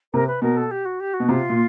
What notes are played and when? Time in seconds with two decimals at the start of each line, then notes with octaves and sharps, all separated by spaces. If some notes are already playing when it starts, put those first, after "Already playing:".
0.14 C3 A#4
0.27 B4
0.42 B2 A#4
0.57 A4
0.71 G4
0.85 F#4
1.00 G4
1.14 F#4
1.20 B2
1.28 C3 F4
1.49 A#2